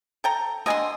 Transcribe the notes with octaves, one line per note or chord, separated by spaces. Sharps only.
A4 G5 A#5
D3 D4 D#5 G#5 C6